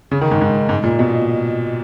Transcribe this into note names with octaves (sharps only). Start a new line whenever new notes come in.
C#3
D#3
G#2
G#2
G#2
A#2
B2